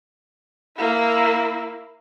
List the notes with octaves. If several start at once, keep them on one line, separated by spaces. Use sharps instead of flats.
A#3 E4